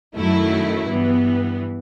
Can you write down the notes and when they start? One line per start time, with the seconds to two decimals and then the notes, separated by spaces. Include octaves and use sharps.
0.16 F#2 D#3 F#3 A3 E4
0.88 G2 E3 B3